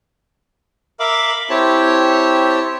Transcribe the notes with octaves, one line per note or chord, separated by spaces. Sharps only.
A#4 E5 F5 B5 D6
C4 E4 G4 C#5 A5